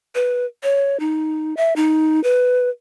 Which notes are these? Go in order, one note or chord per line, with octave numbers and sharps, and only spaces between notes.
B4
C#5
D#4
E5
D#4
B4